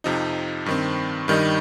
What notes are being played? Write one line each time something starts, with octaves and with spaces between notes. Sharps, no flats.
F2 C3 F3 D#4
G2 D#3 C4
G2 D#3 G3 D#4